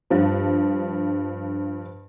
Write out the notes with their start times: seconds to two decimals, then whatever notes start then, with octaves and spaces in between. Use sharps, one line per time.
0.10 G2 F3